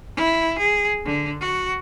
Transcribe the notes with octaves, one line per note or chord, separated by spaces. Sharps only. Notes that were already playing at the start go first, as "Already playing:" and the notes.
E4
G#4
D3
F#4